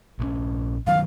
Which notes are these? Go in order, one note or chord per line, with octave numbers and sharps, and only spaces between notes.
A#1 E3 C#4
G2 D#3 F#3 F5